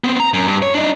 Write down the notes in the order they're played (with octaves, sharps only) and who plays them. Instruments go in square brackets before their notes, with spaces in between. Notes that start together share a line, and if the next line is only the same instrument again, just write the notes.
[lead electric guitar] B3 C4
A#5
F#2
G2
C#5
D4 D#4